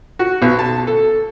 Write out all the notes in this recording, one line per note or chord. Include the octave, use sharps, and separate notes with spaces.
F#4
B1
A5
A4